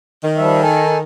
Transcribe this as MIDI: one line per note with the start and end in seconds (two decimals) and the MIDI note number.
0.24 1.01 51
0.37 0.62 53
0.37 0.62 55
0.37 0.62 76
0.62 0.98 69
0.62 0.98 80
0.62 0.98 81